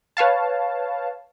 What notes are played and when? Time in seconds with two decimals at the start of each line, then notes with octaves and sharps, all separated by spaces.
0.17 B4 C#5 F5 A5